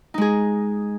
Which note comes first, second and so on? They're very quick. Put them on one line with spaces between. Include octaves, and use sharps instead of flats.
D#4 G#3 G#4